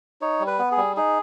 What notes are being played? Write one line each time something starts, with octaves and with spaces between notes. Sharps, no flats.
D#4 C#5
G3
B4
B3
G#4
G3
D#4 G#4